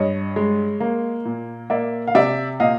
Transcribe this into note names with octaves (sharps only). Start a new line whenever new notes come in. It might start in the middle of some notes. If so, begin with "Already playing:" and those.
Already playing: G2 C#5 D#5
G#3
A#3
A#2
A#3 D5 E5
F5
C3 D5 E5
A#2 D#5 F5